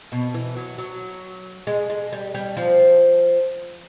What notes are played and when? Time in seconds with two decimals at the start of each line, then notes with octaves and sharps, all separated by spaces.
0.12 B2
0.34 E3
0.56 F#3
0.78 F#3
1.67 G#3
1.90 G#3
2.13 G3
2.35 G3
2.57 F3